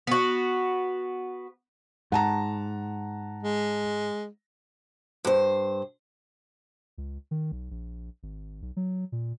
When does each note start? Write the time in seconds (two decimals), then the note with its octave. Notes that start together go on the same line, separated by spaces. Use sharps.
0.07 B3 F#4
2.12 G#2 F#5 A5 A#5
3.43 G#3
5.25 G2 C5
6.98 C#2
7.31 D#3
7.52 B1
7.71 A#1
8.23 G#1
8.62 B1
8.77 F#3
9.12 A#2